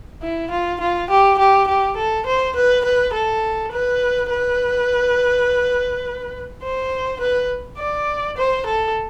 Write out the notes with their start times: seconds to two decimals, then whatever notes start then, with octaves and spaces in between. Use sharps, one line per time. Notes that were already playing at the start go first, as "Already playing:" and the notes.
0.22 E4
0.51 F4
0.80 F4
1.10 G4
1.38 G4
1.68 G4
1.96 A4
2.26 C5
2.55 B4
2.84 B4
3.13 A4
3.72 B4
4.30 B4
6.63 C5
7.20 B4
7.78 D5
8.37 C5
8.66 A4